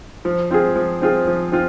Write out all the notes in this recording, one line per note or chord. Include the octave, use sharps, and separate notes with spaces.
F3
C4 F4 G#4
F3
C4 F4 G#4
F3
C4 F4